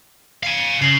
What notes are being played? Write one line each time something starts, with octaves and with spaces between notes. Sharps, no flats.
F5 G#5
C#3 C7 F#7 G7